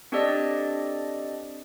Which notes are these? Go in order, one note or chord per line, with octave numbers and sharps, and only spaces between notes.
C4 D4 G4 A4 D5 D#5